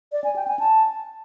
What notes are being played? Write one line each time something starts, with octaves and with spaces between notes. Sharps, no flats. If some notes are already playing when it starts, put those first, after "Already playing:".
D5
G#5
G5
G#5
A5